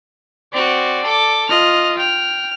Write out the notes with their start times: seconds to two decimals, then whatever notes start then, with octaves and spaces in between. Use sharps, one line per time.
0.53 C4 F#4 D5
1.03 A4 D6
1.49 F4 D#5 F6
1.98 G5 F6